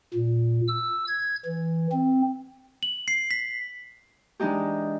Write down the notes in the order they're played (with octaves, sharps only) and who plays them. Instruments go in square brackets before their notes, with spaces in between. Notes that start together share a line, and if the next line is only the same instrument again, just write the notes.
[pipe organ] A#2
E6
G#6
E3
C4
[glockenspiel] F#7
C7
B6
[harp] E3 G#3 D4 D#4 G4